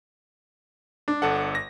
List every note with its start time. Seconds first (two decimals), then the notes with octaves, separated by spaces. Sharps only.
1.08 D4
1.22 G1 A4 F#5
1.55 A#6